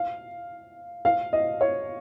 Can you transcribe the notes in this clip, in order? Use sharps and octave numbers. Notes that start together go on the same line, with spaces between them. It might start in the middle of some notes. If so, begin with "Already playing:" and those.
Already playing: F5
F5
D#5
C#5